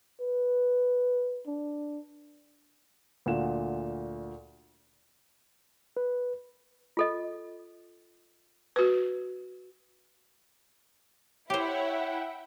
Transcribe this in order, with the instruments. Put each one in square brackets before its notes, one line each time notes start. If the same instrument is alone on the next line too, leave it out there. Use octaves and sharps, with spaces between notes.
[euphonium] B4
D4
[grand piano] D2 A#2 F#5 E7
[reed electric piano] B4
[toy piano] F4 A4 D#5
[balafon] F#4 B4 [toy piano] E6
[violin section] E4 [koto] G4 C5 [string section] C#5 B5 [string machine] E5 F#5 G5